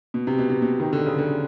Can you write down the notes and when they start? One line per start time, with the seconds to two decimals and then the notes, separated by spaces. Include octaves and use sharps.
0.14 B2
0.27 C3
0.38 B2
0.50 C3
0.62 B2
0.80 D#3
0.93 D3
1.06 C#3
1.18 D3